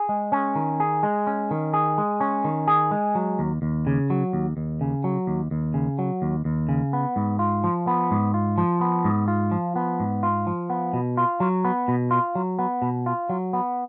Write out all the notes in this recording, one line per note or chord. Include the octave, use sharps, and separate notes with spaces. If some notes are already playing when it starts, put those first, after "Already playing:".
Already playing: G#4
G#3
C#4
D#3
G#4
G#3
C#4
D#3
G#4
G#3
C#4
D#3
G#4
G#3
F#3
D#2
D#2
C#3
F#3
D#2
D#2
C#3
F#3
D#2
D#2
C#3
F#3
D#2
D#2
C#3
B3
G#2
F4
F3
B3
G#2
F4
F3
B3
G#2
F4
F3
B3
G#2
F4
F3
B3
B2
F4
F#3
B3
B2
F4
F#3
B3
B2
F4
F#3
B3